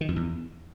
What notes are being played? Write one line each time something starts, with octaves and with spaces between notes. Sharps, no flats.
D#3
F2
E2